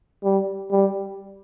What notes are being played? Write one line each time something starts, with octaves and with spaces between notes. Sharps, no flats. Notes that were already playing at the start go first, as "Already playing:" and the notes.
G3
G3